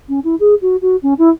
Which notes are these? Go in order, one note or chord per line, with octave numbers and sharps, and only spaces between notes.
C#4
E4
G#4
F#4
F#4
C#4
E4